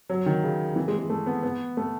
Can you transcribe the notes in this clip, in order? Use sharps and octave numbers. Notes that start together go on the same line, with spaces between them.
F#3
D#3
C#3
E3
G#3
G#3
A3
B3
B3
A3